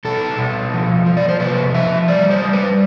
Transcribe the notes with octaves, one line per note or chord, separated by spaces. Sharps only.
B2 A4
B2
F3
F3
D5
C5
C3 B4
F3 E5
G3 D5
C5
G3
B4